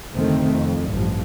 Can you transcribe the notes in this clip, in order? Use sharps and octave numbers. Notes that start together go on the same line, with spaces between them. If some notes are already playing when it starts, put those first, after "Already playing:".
F1 D2 D#3 A3 C4
F2
A1 G2 F3